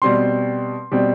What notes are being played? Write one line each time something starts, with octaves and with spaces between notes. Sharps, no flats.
B2 G3 C4 C6
B2 G3 C4